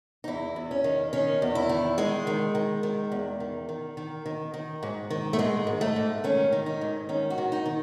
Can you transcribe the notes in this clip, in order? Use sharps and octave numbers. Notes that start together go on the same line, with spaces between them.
D#4
E2 E4
E2
C#4
D#3
D#3 C#4
E2
E4
D#3
D#3 G#3
D#3
D#3
D#3
E2
D#3
D#3
D#3
D#3
D#3
G#2
D#3
A3
G#2 G#3
G#2
A3
G#2
D#3 C#4
D#3
D#4
G#2
D#3 C#4
F#4
D#3
D#4
D#3